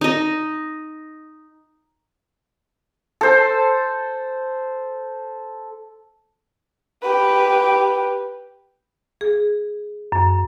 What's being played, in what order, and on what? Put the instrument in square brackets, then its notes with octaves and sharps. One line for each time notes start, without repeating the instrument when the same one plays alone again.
[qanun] D#4 D#5
[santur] A4 C5
[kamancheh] G4 B4
[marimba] G#4
F#2